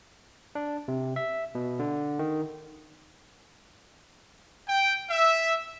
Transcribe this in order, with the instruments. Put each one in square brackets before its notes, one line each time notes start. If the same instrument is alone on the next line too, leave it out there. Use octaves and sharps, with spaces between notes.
[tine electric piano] D4
C3
E5
B2
D3
D#3
[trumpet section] G5
E5